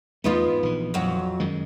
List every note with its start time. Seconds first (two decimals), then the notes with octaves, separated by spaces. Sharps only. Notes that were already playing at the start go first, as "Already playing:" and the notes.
0.24 E2 G#3 A3 B3 D#4 F4
0.46 G#2
0.63 A#1 E3
0.94 F2 F#3
1.40 F#2 D#3 G#3